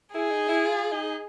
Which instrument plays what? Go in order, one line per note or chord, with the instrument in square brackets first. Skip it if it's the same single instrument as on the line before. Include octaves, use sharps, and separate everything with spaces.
[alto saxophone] E4 [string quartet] G#4
[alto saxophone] D#4
E4
F4
D#4